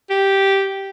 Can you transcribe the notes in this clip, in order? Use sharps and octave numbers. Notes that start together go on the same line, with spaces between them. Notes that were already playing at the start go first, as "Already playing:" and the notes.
G4